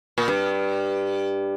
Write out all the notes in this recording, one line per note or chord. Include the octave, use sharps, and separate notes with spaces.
A#2
G2